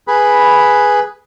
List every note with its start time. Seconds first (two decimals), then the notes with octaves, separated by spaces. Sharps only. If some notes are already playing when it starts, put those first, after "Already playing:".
0.08 G#4 B4 B5